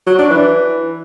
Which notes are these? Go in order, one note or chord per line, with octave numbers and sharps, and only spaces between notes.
F#3
D4
E3